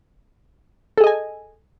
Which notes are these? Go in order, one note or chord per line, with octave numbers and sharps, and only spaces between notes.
G#4 A4 D#5 G#5